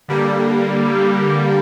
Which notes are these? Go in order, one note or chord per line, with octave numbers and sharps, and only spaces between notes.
D3 G3 A#3